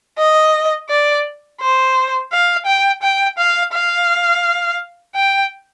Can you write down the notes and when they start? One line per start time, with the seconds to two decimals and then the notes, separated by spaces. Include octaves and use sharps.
0.18 D#5
0.89 D5
1.60 C5
2.31 F5
2.66 G5
3.02 G5
3.38 F5
3.73 F5
5.15 G5